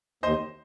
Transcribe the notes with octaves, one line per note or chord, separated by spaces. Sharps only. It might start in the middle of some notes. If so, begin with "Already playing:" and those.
D#2 C5 D#5